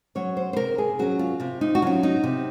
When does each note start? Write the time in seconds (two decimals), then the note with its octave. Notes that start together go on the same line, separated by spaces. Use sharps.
0.15 F#3 C#4 C#5
0.37 C5
0.53 C5
0.57 C3 A#4
0.78 G#4
0.99 F#3 C#4 F#4
1.19 F4
1.40 C3 F4
1.61 D#4
1.75 F#4
1.82 F#3 C#4 F4
2.03 D#4
2.24 C3